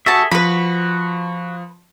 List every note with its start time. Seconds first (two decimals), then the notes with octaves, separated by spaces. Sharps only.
0.06 F#4 G#4 A4 E5 A5
0.31 F3 F#4 B4 B5